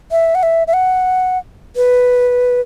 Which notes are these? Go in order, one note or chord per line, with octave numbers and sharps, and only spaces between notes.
E5
F#5
E5
E5
F#5
B4